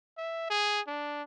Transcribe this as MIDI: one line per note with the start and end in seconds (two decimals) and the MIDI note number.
0.17 0.47 76
0.50 0.81 68
0.87 1.22 62